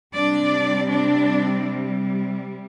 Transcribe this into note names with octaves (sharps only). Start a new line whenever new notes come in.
C3 G3 C4 D4 D5
D4 D5